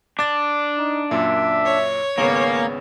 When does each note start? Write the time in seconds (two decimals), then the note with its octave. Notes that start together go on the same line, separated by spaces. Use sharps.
0.19 D4 D6 A6
0.78 D#4
1.11 F#2 A#2 E5
1.66 C#5
2.18 G#1 C#3 A#3 B3 C#4